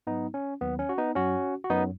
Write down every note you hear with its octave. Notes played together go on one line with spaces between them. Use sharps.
G#2 F#3 B3 D#4
C#4
D#2 D#3 F#3 B3
C#4
F#4
B3 D#4
F#2 F#3 C#4 F#4
F#4
F#2 F#3 B3 D#4